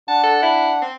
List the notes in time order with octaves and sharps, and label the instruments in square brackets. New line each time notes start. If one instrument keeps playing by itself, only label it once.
[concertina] D4 F#5 [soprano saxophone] A5
[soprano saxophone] A4
E4
C4